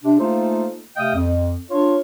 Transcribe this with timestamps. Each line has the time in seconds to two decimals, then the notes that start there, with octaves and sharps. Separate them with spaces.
0.04 C3 D4
0.19 A3 A#3 D#4 F4 A4 C5
0.97 C3 A3 D#5 F5 G5 D#6
1.15 F2
1.71 D4 F4 C#5